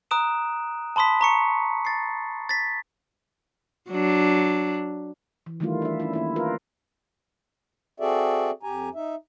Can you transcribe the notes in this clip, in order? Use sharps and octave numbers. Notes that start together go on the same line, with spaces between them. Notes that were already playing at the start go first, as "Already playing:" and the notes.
A#5 D#6 F#6 D7 E7
A5 B5 C6 D#6 B6
A#5 C#6 C#7
A6 C7
A6 B6
F#3 D4
E3
D#3 E3 G3 A3 E4 F4
D4 E5
C#4 E4
D#3 A#3 E4
A3 F4 A#4 B4
C4 F#4 G#4 A4 D5 E5
F2 G4 G#5 A#5
D#4 E5